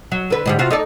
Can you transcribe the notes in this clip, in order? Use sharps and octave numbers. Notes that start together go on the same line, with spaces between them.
F#3
D3 B4
G#2 D3 G3
C3 F4 F#4
D#4 A4 D5